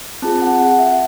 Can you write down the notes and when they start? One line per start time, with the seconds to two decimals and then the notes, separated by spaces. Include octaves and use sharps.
0.22 C4 F4 G#4 A5
0.42 F#5
0.60 F#5
0.79 E5